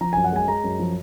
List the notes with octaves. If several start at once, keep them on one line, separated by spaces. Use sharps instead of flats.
F3 A#5
F#2 G#5
F#5
G#3 G#5
G#3 A#5
F#2
F3